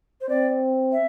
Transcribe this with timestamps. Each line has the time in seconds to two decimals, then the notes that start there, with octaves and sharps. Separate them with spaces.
0.21 C5
0.29 C4 D5
0.92 E5